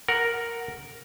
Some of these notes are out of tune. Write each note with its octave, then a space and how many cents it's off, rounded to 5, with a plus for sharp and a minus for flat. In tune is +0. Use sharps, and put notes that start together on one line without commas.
A#4 +0 F#5 +0